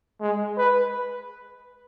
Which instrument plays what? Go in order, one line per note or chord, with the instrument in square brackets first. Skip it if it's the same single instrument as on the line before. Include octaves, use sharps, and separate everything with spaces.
[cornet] G#3
B4